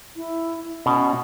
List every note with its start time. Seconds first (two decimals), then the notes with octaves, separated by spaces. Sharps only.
0.16 E4
0.86 B2 C#4